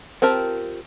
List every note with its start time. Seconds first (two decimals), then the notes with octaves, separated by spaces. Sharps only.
0.22 C4 F4 G4 A#4 A5